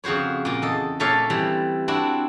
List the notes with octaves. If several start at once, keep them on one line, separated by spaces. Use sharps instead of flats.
F2 C#3 F#4 C5 C#5
A#2 A#3
E2 A4 D#5
A#2 A3 A4 C#5 D5 F5
E3 G3 C4
C4 D4 E4 F#4